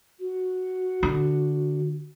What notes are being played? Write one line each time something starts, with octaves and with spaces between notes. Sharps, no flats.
F#4
D3